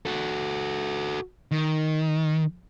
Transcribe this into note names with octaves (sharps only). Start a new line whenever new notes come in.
F#4 A4
D#3